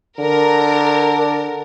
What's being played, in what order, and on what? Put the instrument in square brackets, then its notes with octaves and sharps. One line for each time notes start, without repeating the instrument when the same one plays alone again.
[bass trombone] D3 [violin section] A#4